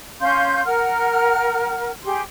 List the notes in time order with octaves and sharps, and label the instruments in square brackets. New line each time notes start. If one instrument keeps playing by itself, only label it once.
[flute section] C#4 F5 C6 G6
A#4 F#5 F6
G4 G#4 C6